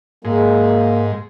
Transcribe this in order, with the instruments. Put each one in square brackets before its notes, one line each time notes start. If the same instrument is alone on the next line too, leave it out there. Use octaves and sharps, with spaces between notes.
[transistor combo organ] G#2 [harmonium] G#3 [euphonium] A#3